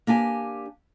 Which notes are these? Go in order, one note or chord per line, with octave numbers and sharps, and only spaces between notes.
A#3 D4 G4 G#5